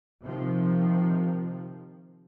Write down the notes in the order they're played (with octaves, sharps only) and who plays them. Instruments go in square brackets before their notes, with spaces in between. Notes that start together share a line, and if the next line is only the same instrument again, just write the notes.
[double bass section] C3 D#3 F3